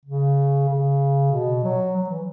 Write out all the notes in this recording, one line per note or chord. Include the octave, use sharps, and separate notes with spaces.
C#3
C#3
B2
F#3
F#3
E3